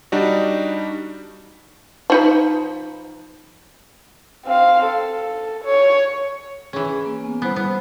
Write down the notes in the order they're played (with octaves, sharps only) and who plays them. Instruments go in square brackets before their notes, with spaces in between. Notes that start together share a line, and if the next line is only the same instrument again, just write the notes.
[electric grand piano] G3 D4 D#4 F#4
[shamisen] F3 D#4 B4
[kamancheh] C4 F5
A4
C#5
[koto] E3 C#4 [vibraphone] G#4
[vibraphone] A#3
B3 G#5
[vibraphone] G3 E4 C5 [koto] B3
[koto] B3